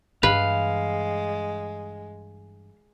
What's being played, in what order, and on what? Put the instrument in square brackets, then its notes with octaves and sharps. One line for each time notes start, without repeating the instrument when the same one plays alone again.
[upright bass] G2 E3 [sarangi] G#3 [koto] B4 [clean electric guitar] F5